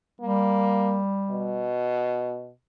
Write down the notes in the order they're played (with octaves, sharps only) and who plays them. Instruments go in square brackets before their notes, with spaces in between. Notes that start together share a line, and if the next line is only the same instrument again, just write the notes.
[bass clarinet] G3 [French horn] A#3
[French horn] B2